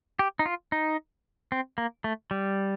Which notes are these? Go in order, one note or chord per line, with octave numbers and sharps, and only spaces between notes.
G4
D#4
F4
D#4
C4
A#3
A3
G3